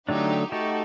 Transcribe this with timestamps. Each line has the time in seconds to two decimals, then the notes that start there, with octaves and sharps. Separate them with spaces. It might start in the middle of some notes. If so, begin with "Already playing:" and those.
0.08 D3 F#3 A3 D4 D#4 G4
0.52 A3 D#4 F#4 G4 A4